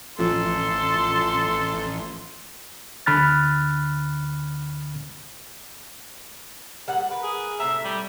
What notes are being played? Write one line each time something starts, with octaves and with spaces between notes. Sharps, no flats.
A1 F3 A4 C6
D2 D3 B5 F6 F#6 A6
A#2 G3 F#5
A#4 B4
G#4
A2 C3 E5 A#5
G3